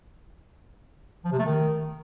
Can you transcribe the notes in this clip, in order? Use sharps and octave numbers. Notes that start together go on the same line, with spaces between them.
F3
C3
A3
D#3